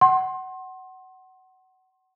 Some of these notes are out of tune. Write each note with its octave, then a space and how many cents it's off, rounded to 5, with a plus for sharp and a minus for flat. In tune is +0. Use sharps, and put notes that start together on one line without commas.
F#5 +20 C6 +25